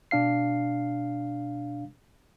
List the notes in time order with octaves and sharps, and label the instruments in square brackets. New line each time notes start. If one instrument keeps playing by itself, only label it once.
[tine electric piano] B2 D4 F5 C7